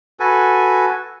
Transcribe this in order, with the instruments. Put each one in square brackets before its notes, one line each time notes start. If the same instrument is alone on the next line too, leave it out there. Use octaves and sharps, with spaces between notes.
[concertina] F#4 A4 B4 G#5